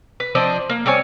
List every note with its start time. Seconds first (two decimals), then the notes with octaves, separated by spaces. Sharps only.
0.20 B4
0.35 F3 C4 D4 D#5
0.70 A#3
0.86 G3 C4 C#5 G#5